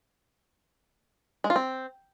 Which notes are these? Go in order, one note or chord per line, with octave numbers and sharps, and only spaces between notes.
G#3
F4
C4